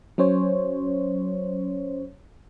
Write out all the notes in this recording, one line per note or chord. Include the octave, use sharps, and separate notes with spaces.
F#3 C#4 C5 C#5